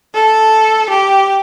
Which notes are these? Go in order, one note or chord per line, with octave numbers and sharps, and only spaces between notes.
A4
G4